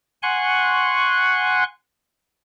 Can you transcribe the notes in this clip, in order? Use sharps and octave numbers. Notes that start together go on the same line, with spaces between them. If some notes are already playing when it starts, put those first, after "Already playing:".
F#5 G#5 C6 C#6 F#6